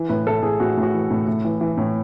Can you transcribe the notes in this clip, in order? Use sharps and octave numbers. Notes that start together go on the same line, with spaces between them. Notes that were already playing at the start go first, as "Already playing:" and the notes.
Already playing: E3
A2 B4
A2 A4
A2 G#4
A2 F#4
A2
F#4
E3
A2
A2
E3
E3
A2